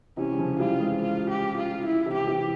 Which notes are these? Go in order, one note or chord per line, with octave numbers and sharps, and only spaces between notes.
C3 E3 C#4
G3
C#3 F3
E3 G3 F4
G#3 C4
F4
G4
F4
E4
C3 E3
G4
C3 E3